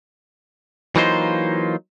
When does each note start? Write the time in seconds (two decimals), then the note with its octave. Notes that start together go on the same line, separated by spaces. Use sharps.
0.96 E3 F#3 A#3 D#4 F4 C5